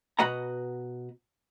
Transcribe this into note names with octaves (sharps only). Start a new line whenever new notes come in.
B2 F#4 B4 D#5 F#5 A#5